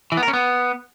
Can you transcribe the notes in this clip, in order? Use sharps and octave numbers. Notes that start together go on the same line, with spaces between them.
E3
B3
A#4
C#4
B3